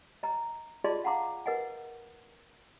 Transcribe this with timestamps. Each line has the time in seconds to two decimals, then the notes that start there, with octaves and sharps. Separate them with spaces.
0.23 D#5 A#5
0.84 F4 G#4 D5 D#5 A5 C6
1.04 F5 F#5 A5 A#5 C6 D6
1.46 A#4 B4 D#5 F#5 G#5